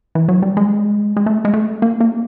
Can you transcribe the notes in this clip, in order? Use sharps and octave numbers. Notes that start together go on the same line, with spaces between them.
E3
F#3
G3
G#3
G#3
A3
G#3
A3
A#3
A#3